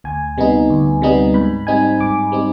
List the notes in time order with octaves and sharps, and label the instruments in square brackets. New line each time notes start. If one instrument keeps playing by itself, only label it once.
[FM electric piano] D2 G#5
C3 G3 B3 D#4
D2
C3 G3 B3 D#4
G#2 B5
G3 C4 D#4 G#5
G#2 D6
G3 C4 D#4